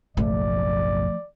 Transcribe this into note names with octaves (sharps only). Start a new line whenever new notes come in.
F#1 B1 F3 A3 D5